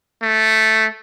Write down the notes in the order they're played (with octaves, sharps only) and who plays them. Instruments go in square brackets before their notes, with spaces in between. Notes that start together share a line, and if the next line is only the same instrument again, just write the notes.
[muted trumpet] A3